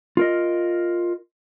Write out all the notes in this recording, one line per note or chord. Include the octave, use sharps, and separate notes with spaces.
F4 A#4 D#5